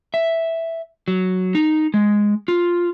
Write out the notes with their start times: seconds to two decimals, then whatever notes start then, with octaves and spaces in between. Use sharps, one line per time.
0.14 E5
1.08 F#3
1.55 D#4
1.94 G#3
2.48 F4